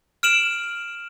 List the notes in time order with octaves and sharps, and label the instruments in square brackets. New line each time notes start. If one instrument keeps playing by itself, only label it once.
[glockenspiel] F6 D7 E7 F#7